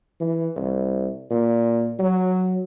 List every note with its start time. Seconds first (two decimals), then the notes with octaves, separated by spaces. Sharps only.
0.20 E3
0.56 C2
1.31 A#2
1.99 F#3